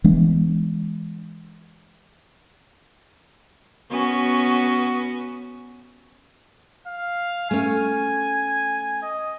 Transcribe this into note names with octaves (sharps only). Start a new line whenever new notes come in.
E3 G#3 B3 D4
B3 C#4 F#4
F5
A3 C#4 G#5
D#5